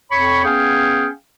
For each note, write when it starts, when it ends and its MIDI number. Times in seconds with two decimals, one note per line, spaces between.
0.12 0.42 41
0.12 0.42 73
0.12 0.42 83
0.12 0.42 85
0.45 1.09 59
0.45 1.09 61
0.45 1.09 68
0.45 1.09 77
0.45 1.09 79